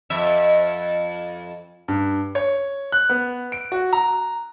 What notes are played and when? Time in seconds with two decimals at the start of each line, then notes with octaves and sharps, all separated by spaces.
0.10 F2 E5
1.88 G2
2.35 C#5
2.92 F#6
3.09 B3
3.52 D7
3.72 F#4
3.93 A#5